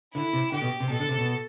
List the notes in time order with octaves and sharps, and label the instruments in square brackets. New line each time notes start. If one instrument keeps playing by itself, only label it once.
[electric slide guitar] D3 [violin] E4
[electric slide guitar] C3
[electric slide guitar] D3 [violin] G4
[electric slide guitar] B2
C3
[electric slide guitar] B2 [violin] A4
[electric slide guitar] D3
C3
B2